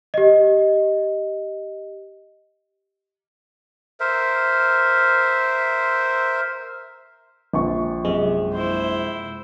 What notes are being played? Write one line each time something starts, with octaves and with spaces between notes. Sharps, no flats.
G4 D#5
A#4 C5 E5
A#1 C#6
F#2 C3 G#3
E4 C5